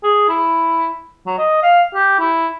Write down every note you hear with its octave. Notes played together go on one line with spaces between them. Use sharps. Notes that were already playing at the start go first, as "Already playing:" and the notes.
G#4
E4
F#3
D#5
F5
G4
E4